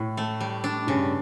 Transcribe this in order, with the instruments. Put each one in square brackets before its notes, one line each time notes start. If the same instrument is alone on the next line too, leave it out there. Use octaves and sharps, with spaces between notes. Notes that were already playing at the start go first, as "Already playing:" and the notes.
Already playing: [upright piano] A2
[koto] A3
G3
D4
[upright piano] G2 [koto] C#3